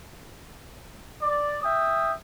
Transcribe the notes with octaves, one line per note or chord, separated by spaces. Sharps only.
D5
E5 G5 D#6